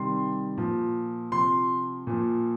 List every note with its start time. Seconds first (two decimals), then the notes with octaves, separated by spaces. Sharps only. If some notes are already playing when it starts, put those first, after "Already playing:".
Already playing: C3 D#3 G3 C6
0.57 A#2 F3
1.31 C3 F3 C6
2.07 A#2 F3